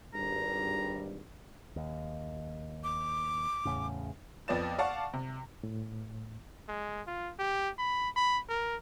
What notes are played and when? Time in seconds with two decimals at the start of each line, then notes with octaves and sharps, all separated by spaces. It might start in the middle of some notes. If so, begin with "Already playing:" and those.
0.14 G#1 G2 G3 A#5
1.76 D#2
2.84 D6
3.65 E2 A2 C#3
4.48 F2 B3 D5 A6 E7
4.79 D5 F5 F#5 A5 C#6
5.14 C3
5.63 A2
6.68 G#3
7.07 F4
7.39 G4
7.78 B5
8.16 B5
8.49 A#4